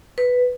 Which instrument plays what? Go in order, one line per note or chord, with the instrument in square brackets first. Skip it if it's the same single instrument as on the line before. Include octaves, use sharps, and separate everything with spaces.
[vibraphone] B4